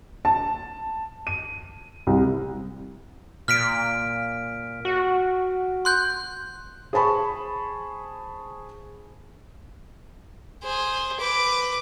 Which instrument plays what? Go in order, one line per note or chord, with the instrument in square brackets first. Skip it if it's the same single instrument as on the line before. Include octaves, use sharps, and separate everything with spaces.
[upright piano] A5
D#7
C2
[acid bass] A#2 [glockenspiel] F6 B6 D7
[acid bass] F#4
[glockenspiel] C6 F#6 G6
[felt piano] G#4 C5 A5 B5 C#6
[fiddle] G#4 C5
B4 D6